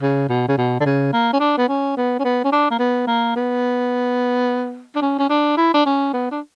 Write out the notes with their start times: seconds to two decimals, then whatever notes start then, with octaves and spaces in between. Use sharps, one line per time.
0.02 C#3
0.29 B2
0.48 C#3
0.58 B2
0.80 D3
0.86 C#3
1.13 A#3
1.33 C#4
1.40 D4
1.58 B3
1.68 C#4
1.97 B3
2.20 C#4
2.25 B3
2.44 C#4
2.52 D4
2.71 A#3
2.79 B3
3.07 A#3
3.36 B3
4.95 D4
5.02 C#4
5.19 C#4
5.29 D4
5.57 E4
5.74 D4
5.86 C#4
6.13 B3
6.31 D4